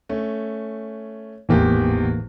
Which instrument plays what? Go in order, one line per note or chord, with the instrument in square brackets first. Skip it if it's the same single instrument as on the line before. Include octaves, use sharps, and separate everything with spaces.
[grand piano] A3 C#4
[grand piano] G#1 E2 G4 [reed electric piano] A2 E3 A#3